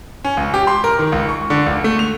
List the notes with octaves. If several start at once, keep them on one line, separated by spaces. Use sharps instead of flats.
C#4
C#2
G4
C6
A#4
D#3
C#2
C#6
D3
C#2
A3
F7